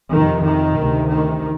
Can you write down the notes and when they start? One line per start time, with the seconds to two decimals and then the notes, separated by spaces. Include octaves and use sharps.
0.11 F2 C3 D#3
0.44 D#3
0.77 D2 C3
1.10 D#3